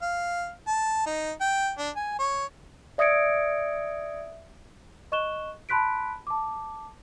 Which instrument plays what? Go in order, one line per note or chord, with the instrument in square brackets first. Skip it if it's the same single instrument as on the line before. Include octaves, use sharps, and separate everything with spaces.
[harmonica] F5
A5
D#4
G5
D4
G#5
C#5
[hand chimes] D5 E5 D#6 G#6 C#7 D7
[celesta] D#5 C#6 F#6 E7 G7
A5 B5 C6 F#6 B6 D7
A5 D6